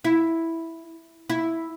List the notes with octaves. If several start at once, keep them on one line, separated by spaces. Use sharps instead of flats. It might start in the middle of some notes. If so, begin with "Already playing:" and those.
E4
E4